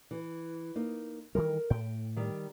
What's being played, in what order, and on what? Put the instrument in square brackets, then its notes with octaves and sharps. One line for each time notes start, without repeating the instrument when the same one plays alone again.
[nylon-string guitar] E3
A#3 D#4
[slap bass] D#3 E3 G3 [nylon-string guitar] A#4
[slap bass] A2 [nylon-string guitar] G5
[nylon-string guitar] D#3 G3